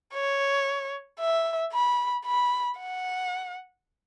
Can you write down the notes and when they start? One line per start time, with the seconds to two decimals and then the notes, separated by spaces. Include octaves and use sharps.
0.14 C#5
1.20 E5
1.73 B5
2.26 B5
2.79 F#5